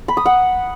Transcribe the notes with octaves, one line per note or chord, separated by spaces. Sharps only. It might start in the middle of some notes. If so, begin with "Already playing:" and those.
B5
D#6
F#5